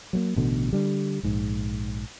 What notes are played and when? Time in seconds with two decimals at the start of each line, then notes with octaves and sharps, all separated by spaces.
0.13 F#3 A3 A#3
0.36 A1 B2 D3
0.73 D3 G3
1.23 A#1 G#2